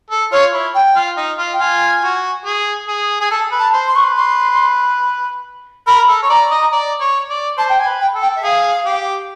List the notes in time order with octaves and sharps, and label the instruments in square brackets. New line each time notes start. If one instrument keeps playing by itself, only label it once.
[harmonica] A4
[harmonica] F4 [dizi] C#5
[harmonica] E4
[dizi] G5
[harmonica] F4
D#4
F4
[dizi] G5
[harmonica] F4 [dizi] G#5
[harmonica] F#4
G#4
G#4
[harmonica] G#4 [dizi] G#5
[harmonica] A4 [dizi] A5
[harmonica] B4
[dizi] A5
[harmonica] C5
[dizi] C6
[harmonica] B4 [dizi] C#6
[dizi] C6
C6
[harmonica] A#4 [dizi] B5
[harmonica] A4
C#5
[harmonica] D5 [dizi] A#5
[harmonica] D#5
D5
C#5
D5
[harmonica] C5 [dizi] A5
[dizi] G5
G#5
[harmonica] B4
[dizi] G5
[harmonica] A4
[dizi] G5
E5
[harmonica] G#4 [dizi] F5
[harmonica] G4